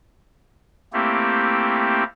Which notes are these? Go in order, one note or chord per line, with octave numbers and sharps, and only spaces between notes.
A3 A#3 C4 E4 G4